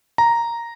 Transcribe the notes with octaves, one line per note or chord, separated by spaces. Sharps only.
A#5